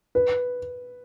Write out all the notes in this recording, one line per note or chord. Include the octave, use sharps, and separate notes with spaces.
B4